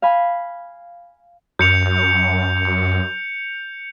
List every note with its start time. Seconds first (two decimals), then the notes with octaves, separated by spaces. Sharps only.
0.02 F5 G#5 B5
1.59 F#2 G6 C#7 F7